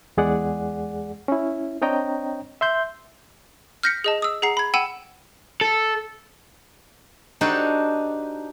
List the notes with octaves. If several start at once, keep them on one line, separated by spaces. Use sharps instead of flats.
E2 G#3 G#4 D5 F#5
C#4 E4
C4 D4 C#5 D#5 G5 A#5
E5 C6 G6
F6 G6 A#6 B6 C#7
G#4 D#5 A5
D#6 E6
G#4 F#5 A#5 C7
B5 G#6
F#5 G5 B5 E6 D#7 E7
A4
D4 D#4 F#4 G4 A4 C5